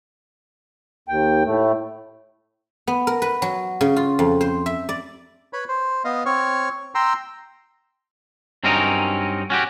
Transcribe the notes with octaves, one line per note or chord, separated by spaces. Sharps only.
D#2 G5
A2 A3
B3
A#4
B4
F#3
C#3
F4
F2
C5
E5
D5
B4 C#5 B5
C5
B3 D#5 F5
C4 C#5 C#6 F6
G5 A#5 C6 E6
G2 F#3 C4 C#4 D#4 A#4
C#4 F#4 G4